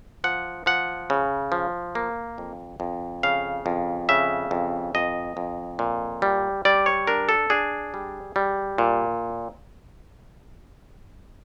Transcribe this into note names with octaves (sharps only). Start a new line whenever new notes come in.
F3 F#5
F3 F#5
C#3
F3
A#3
F2
F2
C#3 F5
F2
C#3 E5
F2
F2 D#5
F2
A#2
G3
G3 D5
C#5
D4 A#4
A4
D4 G#4
G3
G3
A#2